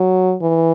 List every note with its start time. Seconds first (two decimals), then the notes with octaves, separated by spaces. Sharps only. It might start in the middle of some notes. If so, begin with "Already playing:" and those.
Already playing: F#3
0.42 E3